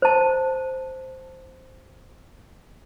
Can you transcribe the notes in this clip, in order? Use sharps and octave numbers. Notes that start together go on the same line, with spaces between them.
C5 A5